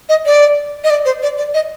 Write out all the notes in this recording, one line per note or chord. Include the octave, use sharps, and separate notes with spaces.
D#5
D5
D#5
D5
C5
D5
D5
D#5